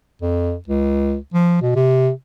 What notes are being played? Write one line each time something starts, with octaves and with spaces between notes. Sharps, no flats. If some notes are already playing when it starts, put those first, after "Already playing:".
F2
C#2
F3
B2
C3